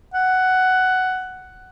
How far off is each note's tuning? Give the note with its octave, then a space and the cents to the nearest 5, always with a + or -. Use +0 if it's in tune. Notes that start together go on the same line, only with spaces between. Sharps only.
F#5 +10